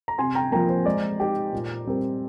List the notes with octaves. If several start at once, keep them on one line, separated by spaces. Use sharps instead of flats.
A#5
C3 G#5 C6
G5 A#5
F3 A#3 G5 A#5
C5
G#3 D5
D#4 G4
A#2
G3 C4 G4 A#4